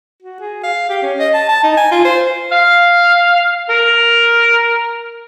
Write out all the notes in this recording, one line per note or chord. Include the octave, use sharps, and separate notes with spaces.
F#4
G#4
F5
G4
C#4
D#5
A5
A5
D#4
G#5
F4
C5
F5
A#4